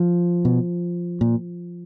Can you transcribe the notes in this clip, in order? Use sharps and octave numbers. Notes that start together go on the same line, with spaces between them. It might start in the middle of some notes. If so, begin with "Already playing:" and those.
Already playing: F3
B2
A#2